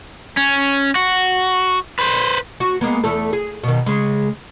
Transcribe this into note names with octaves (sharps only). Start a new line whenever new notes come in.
C#4
F#4
B4 C5
F#4
G#3 A#3 B3
E2 A3 A4
G#4
B2 D#3
C#3 G#3